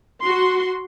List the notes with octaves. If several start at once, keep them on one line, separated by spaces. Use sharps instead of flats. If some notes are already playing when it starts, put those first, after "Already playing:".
F#4 C6